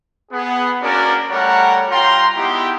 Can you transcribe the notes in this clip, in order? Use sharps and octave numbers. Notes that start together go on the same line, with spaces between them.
B3 G#4
A#3 C#4 D4 F#4 A#4 D5
G3 A3 A#4 C#5 F#5
G3 F4 G5 A#5 C6
G#3 B3 D#4 E4 G4